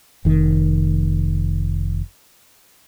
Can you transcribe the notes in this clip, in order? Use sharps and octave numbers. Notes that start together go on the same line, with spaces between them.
F1 D#3